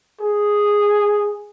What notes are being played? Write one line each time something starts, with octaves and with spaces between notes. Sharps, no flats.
G#4